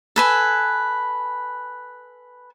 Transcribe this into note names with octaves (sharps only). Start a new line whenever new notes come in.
A4 B4 G#5